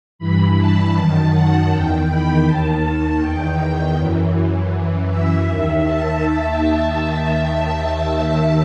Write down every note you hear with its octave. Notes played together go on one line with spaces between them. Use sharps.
G2 E3 B5
A5
F#2 D#3
F#5
E2 D#3 G5
B5
D#2 D#3 A5
E2 D#3 G5
F#2 E3
F#2 E3
E5
D#2 D#3
A5